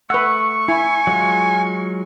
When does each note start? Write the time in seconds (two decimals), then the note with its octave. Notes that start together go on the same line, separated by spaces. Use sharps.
0.10 A3 B4 F#5 C#6 E6
0.68 E4 G#5
1.07 F#3 G#3 F4